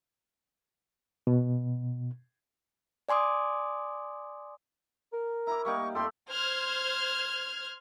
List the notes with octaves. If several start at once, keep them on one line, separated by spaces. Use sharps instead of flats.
B2
D5 G#5 C6 D6 D#6
A#4
E4 A#5 D6
G3 A#3 D#4 C#6
F2 A3 G4 A4 C6
C5 F6 G#6